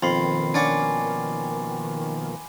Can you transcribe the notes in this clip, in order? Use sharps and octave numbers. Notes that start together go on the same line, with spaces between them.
F2 B2 D#3 F3 A#3 B5 C6 C7
C#4 D4 F#5 G#5 D6